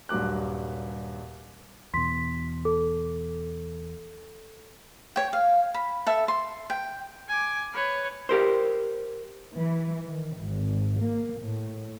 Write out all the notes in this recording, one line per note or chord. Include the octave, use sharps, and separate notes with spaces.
D#1 G2 F#3 D6 F#6
E2 B2 C6 B6
A4
C#5 G5
F5
B5
A4 E5
C6
G5
G#5 D6
B4 C#5
G4 A#4 C5
E3
D#3
G#1
A#3
A2